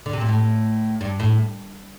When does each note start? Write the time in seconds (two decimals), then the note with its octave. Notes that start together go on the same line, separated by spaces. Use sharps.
0.06 D3
0.13 C3
0.21 A#2
0.29 A2
1.01 G2
1.20 A2